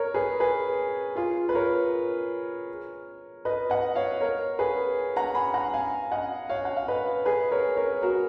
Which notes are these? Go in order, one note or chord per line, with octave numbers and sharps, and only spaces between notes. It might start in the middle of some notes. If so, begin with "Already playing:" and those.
Already playing: A#4 C#5
G#4 B4
G#4 B4
F4 G#4
B4
A#4 C#5
B4 D#5
D#5 F#5
C#5 F5
A#4 C#5
G#4 B4
F#5 A#5
G#5 B5
F#5 A#5
F5 G#5
D#5 F#5
C#5 F5
F#5
F5
B4 D#5
G#4 B4
A#4 C#5
A#4 C#5
F#4 A#4